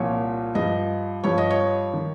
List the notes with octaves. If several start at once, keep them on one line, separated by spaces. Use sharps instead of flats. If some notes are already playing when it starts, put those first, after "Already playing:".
Already playing: C2 A#2 F3 C#5
G2 F3 D#5
G2 F3 C#5
D#5
C#5
D#3